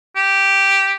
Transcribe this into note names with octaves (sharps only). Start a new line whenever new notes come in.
G4